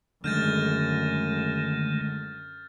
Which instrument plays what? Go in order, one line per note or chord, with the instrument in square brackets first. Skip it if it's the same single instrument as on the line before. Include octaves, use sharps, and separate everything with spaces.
[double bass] F#2 [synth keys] D3 G#3 [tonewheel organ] D#3 A3 [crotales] F6 G6 A6